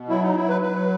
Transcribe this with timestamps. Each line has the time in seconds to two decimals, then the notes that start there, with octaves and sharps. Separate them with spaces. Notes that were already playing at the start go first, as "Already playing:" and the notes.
Already playing: B2
0.09 F#3 E4
0.22 D#4
0.35 F#3 E4
0.49 B4
0.61 F#3 B4